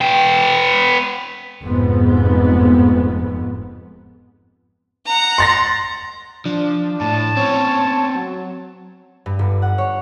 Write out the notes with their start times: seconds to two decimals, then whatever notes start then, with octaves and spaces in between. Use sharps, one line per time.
0.01 B3 G5
1.62 F1 F2 G#2 B3
5.06 F#5 A#5
5.38 C6 A6 A#6
6.46 F3 D4
7.01 A2 A5
7.37 C4 C#4 C#5
8.15 F#3
9.26 G2
9.39 G1
9.62 F#5
9.78 C#5